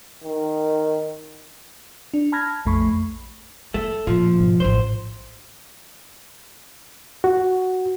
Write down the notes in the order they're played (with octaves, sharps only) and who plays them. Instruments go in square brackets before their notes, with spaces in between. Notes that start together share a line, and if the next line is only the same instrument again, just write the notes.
[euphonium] D#3
[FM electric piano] D4
A5 B5 F6 G#6 A#6
A#1 F2 A3 B5 C#6
[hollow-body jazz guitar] A3 [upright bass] E4
[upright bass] A#2 [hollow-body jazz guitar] F3
[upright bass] G#2 B2
[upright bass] A1 G2 [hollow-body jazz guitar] C5
[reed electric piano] F#4